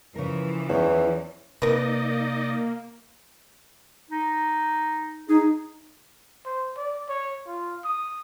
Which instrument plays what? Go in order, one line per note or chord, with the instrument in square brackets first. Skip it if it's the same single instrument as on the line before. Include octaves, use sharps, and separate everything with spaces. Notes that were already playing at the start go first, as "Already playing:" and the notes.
[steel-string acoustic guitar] C#3 A#4 [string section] E3 F3
[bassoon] E2 [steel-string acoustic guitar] C#4 E4 C#5
[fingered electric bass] C3 [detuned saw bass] A#3 [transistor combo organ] D#4 D5 D#5 [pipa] A#4 B4
[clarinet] D#4
[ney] D#4 [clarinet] G#4
[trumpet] C5
D5
C#5
F4
D#6